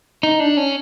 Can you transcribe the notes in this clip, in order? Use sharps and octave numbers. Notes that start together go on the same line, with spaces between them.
D#4
D4
C#4